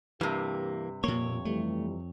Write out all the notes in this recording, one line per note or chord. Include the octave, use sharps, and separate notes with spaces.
G2 C3 E3 A#3 G4
F2 A#2 A#3 C#5
E3 G3 A3